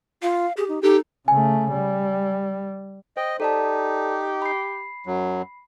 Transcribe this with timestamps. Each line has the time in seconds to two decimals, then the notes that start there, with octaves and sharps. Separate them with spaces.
0.22 F4 F5
0.57 G4 G#4
0.68 D#4
0.83 D#4 G4 A4
1.28 C#3 A3 G#5
1.72 G3
3.17 C5 D#5 G5
3.40 D#4 G4 A4 D5 A5
4.42 B5 C7
5.06 F#2 F#3